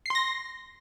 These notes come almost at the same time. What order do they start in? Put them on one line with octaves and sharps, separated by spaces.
C7 C6 A#6